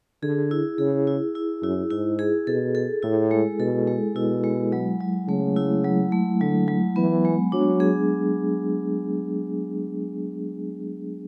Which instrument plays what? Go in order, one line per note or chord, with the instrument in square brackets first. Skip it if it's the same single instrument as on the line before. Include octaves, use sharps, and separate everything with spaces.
[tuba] D3 [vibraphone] G#4
[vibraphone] E4
[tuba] C#3 [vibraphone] G#4
[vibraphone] E4
E4
[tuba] F#2 [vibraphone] E4
[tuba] G#2 [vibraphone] E4
[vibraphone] G#4
[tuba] B2 [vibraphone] A4
[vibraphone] A4
[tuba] A2 [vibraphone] E4
[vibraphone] G#3
[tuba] B2 [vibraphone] A4
[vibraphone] G#3
[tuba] B2 [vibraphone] E4
[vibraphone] G#3
F#3
F#3
[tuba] C#3 [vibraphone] A3
[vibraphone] E4
F#3
A3
[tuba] D3 [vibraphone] F#3
[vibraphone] F#3
[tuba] E3 [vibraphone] B3
[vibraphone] G#3
[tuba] F#3 [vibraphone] D4
[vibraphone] G#4